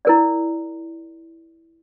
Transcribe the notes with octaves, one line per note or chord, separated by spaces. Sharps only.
E4 A#4 D5